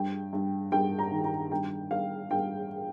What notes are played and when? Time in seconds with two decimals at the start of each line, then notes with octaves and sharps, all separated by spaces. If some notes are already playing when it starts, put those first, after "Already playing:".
Already playing: G2 G5
0.33 G2
0.72 G2 G5
0.99 A#5
1.11 D#3
1.24 A#5
1.52 G2 G5
1.91 G2 F5
2.30 G2 G5